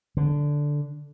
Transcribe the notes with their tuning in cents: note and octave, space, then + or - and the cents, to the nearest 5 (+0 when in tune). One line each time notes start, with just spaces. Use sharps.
D3 -5